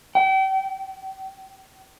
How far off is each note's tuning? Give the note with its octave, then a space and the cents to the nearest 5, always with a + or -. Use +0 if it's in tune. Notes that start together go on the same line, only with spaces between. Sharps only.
G5 -35